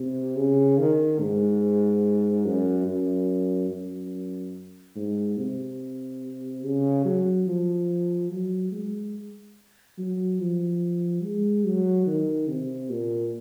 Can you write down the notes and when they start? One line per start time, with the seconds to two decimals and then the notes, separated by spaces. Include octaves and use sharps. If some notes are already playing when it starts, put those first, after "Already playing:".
Already playing: C3
0.37 C#3
0.78 D#3
1.20 G#2
2.46 F#2
2.87 F#2
3.70 F#2
4.96 G#2
5.38 C3
6.63 C#3
7.05 F#3
7.47 F3
8.30 F#3
8.72 G#3
9.98 F#3
10.40 F3
11.23 G#3
11.65 F#3
12.07 D#3
12.48 C3
12.90 A#2